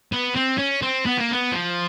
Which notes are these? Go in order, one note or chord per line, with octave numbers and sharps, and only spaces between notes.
B3
C4
C#4
C4
B3
A#3
B3
F3